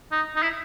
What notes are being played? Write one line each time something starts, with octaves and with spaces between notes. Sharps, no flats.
D#4
D#4
E4